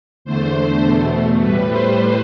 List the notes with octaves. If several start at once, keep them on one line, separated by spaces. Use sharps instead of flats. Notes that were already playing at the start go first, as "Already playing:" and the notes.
E2 D3 A3 C5
E2 B2 A3
A2 G3 B4
C5